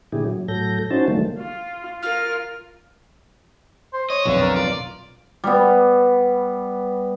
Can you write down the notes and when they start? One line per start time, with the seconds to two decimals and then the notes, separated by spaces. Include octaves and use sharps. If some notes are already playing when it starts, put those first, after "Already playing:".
0.12 A#2 D3 E4 G4 G#4
0.25 F#3
0.48 A2 F#3 A4 G6 A#6
0.90 C#4 D#4 E4 F#4 C5 A5
1.08 D3 D#3 F#3 G3 A3 A#3
1.39 F4
2.02 F4 A#4 F6
3.93 C5
4.10 C#5 D#5
4.26 B1 F2 D3 E5
4.42 A#4
4.56 F4 D5
5.44 G3 B3